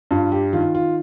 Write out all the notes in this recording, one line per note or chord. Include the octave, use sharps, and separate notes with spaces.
G2 F4
G4
D#3 F4
F4